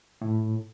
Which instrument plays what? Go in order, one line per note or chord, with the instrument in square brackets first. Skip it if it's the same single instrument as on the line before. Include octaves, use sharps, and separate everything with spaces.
[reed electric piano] A2